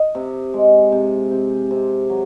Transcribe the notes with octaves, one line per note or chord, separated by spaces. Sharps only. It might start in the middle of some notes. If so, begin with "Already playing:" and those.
Already playing: D#5
C3
G#3
C3
C3
C3
F#3